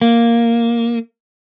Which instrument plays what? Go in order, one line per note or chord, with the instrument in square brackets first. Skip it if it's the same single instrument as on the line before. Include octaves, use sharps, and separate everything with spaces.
[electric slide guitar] A#3